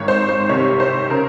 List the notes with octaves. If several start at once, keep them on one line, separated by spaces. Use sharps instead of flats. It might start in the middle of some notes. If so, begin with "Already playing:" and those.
Already playing: G#1 G#2 D#3 C#5
C5
C5
C2 C3 D#3 C#5
C5
C#3 A#4